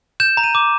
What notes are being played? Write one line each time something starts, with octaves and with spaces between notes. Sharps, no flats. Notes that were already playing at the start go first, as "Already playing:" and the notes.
G6 E7
A#5
D#7
D6